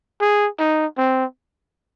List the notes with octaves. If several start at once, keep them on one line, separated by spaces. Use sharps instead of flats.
G#4
D#4
C4